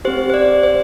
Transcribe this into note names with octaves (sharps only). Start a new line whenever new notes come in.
C4 G4 C5
C5
D5
C5